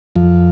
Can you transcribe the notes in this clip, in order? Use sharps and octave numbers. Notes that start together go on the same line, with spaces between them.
F2 F3